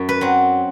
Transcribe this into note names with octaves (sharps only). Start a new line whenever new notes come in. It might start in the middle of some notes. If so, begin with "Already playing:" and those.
Already playing: F#2
B4
F#3 C4